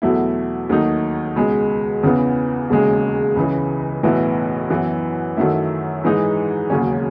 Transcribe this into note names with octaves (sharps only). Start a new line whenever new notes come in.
E2 B2 F#3 A3 E4
D#2 D#3 F#3 A3 D#4
C#2 B2 G#3
E2 C#3 E3 B3
E1 D#2 C#3 G#3
C#2 C#3 E3
B1 A2 E3 B3 E4
F#2 E3 B3 E4
F#2 D#3 F#3 A3 E4
G#2 E3 G#3 D#4
E1 D#2 C#3 F#3 C#4